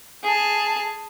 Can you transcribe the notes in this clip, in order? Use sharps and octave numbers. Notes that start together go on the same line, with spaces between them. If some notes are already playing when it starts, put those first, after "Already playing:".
G#4 A5